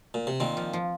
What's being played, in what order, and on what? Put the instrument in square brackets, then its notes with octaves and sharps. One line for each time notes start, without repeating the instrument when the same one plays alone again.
[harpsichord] A#2
C3
[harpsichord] A#2 D#3 [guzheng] C4
[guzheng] F3
F3